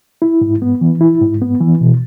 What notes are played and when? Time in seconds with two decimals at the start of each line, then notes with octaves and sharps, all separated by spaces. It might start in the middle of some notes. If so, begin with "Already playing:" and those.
0.22 E4
0.41 G#2
0.62 B3
0.81 E3
1.01 E4
1.21 G#2
1.42 B3
1.60 E3
1.81 B2